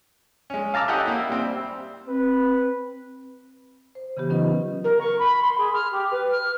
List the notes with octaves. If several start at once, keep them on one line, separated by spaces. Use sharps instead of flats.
G#3 C#4
F5 A5 A#5 D6 E6 F6
C#4 E4 G4 A4 D#5 F#5
A#3 E4
G3 C4
C4 B4
C5
C#3 E3 B3 G4
F#3 C#4 D#4 F4 B4 D#5
A#4
C#6
B5
C6
G#4
F6
G4
B4
F6